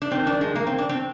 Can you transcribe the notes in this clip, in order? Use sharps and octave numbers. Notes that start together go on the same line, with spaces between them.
D4
F2 D#3 C4
D4
G#3
A#3
C4
D4
C4